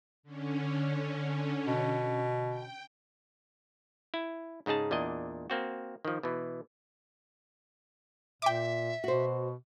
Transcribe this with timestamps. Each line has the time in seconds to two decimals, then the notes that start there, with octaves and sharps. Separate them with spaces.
0.23 D3 C#4
1.66 B2
2.49 G5
4.14 E4
4.66 G#2 C#3 D#4 G#4 A5
4.91 E2 A#2 D4 D#5
5.50 A#3 C4 F#4
6.05 D#3 F3
6.23 B2 E3
8.42 A#2 E5 G5 D6
9.04 B2 F#4 C5